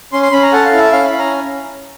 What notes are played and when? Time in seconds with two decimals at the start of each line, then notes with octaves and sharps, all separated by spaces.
0.13 C#4 C6
0.23 C6
0.32 C#4 B5
0.42 A#5
0.52 A4 F#5
0.65 F5
0.72 E4
0.78 E5
0.92 C#4 F5
1.05 B5
1.12 C#4
1.19 A#5